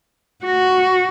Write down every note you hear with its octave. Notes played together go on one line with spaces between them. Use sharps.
F#4